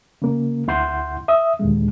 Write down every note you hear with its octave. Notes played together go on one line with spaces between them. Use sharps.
C#3 A#3
D2 E4 F#5 C6 G6
E5 D#6
D#2 A#2 D3 G#3